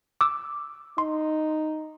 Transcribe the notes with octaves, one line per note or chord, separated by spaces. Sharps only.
D6 E6
D#4 C6